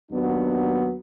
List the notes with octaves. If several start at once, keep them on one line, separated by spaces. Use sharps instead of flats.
D#2 F#3 B3 D4